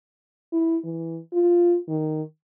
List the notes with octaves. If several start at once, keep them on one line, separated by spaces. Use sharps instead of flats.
E4
E3
F4
D#3